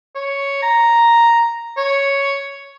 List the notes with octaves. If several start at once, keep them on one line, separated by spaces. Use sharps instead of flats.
C#5
A#5
C#5